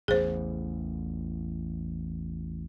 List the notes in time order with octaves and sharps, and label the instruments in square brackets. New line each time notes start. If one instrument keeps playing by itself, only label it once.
[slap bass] A1 E2 [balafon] G#4 C5